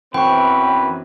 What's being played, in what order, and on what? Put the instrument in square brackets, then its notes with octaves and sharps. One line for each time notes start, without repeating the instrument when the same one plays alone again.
[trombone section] F#2 C4 [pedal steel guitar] E3 B3 [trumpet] B4 [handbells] G5 C#6